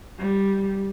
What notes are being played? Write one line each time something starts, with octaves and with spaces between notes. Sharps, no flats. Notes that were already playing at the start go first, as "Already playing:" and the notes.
G3